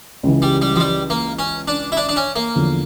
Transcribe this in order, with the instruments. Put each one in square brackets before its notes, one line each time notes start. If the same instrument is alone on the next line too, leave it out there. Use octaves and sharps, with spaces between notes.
[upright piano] C#2 C#3 E3
[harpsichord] G3
G3
F3
G3
A#3
C#4
D4
E4
D4
D4
C#4
A#3
[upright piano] E2 D3 F3